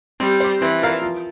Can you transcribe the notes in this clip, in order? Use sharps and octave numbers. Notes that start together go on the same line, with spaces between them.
G3 C4
G4 C5
E3 C4
F4 A#4 F5
F3